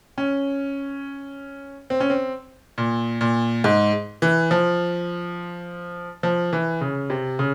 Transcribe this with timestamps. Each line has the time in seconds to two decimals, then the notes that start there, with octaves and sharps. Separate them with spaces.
0.18 C#4
1.90 C4
2.00 C#4
2.10 C4
2.78 A#2
3.21 A#2
3.64 G#2
4.22 E3
4.51 F3
6.23 F3
6.53 E3
6.81 C#3
7.10 C3
7.39 C#3